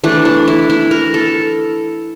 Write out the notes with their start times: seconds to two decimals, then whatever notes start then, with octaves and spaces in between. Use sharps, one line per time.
0.04 E3 A3 D4
0.25 D4
0.48 E4
0.70 E4
0.91 A#4
1.14 A4